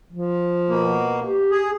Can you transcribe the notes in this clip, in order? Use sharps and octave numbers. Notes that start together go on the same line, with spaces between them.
F3
B2 A#3
G4
G#4